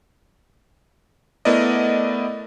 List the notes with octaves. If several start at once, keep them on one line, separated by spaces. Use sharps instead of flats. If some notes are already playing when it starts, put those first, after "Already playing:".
A3 B3 E4 A#4 D5 D#5